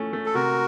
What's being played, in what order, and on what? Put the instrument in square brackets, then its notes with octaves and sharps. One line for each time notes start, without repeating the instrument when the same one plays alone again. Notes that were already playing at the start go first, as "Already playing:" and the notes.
Already playing: [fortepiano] A2 F3 A3 C#4
A3
[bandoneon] A4
[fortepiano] C3 [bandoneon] F#4 A#4